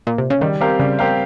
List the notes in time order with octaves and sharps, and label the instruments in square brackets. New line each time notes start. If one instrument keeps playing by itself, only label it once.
[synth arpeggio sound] A#2
C3
C#3
[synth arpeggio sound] D#3 [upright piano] G3
[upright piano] C4 G4 A#4 F5
[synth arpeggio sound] C#3 [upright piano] G3
[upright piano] C4 G4 A#4 F5